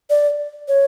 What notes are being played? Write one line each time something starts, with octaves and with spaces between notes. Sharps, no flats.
D5
C#5